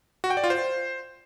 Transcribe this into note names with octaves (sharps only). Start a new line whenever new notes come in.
F#4
G5
D5
F4
C5